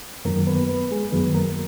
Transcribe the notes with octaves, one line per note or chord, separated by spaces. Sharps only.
F#2 D#3 F#3 A#3 A#4
B3 B4
B3 B4
G#3 G#4
F#2 D#3 F#3 B3 B4
A#3 A#4